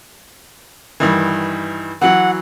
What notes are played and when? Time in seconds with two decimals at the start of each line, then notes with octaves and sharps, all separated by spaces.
1.00 G2 D#3 E3
2.01 E3 F#3 F#5